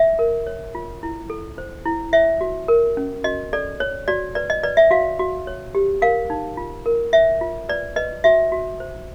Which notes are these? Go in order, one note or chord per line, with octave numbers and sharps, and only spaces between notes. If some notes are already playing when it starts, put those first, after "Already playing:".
Already playing: E5
A#4
C#5
F4
E4
A4
C5
E4
C#5 E5
F#4
A#4
C#4
F#4 D#5
A4 D5
C#5
F#4 D5
B4 D5
D#5
B4 D5
E5
F#4 F5
F#4
C#5
G4
A#4 F5
D#4
F4
A#4
C#5 E5
F4
B4 D5
B4 D#5
F#4 E5
F#4
C5